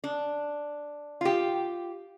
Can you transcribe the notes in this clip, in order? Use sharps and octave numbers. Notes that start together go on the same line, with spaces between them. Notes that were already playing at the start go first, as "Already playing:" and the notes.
D4
F4 G4